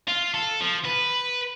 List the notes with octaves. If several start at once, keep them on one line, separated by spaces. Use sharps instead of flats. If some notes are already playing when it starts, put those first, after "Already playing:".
F4
A4
F3
B4